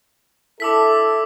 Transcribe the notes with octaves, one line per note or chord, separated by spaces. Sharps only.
D4 E4 A4 D6 E6 B6